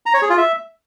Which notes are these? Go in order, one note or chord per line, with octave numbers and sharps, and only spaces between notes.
A#5
C#5
G#4
F4
E5